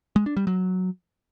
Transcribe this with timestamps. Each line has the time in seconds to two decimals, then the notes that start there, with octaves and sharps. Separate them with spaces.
0.16 G#3
0.26 D4
0.37 G3
0.47 F#3